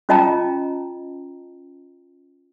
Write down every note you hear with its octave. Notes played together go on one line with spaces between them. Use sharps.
C#4 F4 D#5 G5 A5 A#5